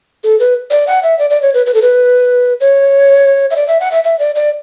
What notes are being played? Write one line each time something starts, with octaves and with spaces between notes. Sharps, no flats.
A4
B4
D5
F#5
E5
D5
D5
C#5
B4
B4
A4
B4
C#5
E5
D5
E5
F#5
E5
E5
D5
D5